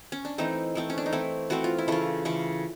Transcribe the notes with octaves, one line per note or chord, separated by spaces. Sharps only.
C#4
D4
E3 A3 C4 D#4
E3 A3 C4
C#4
D4
D#4
E3 A3 C4 E4
E3 A3 C4 F#4
F4
E4
C#3 E3 A3 F4
C#3 E3 A3